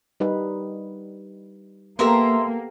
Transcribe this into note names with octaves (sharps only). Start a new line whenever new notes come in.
G3 D#4 B4
A#3 B3 G4 A4 A#4 E5 A#5 C6